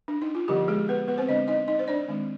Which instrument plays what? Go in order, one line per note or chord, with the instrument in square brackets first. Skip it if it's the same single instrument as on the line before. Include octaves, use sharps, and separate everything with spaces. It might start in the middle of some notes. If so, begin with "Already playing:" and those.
[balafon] D4
D#4
F4
D3 F3 G3 B3 G4
G#3 G#4
B3 B4
B3 B4
C4 C5
D3 G#3 D4 D#5
D#4 D#5
D#4 D#5
C5
D4 D5
D#3 G#3 C4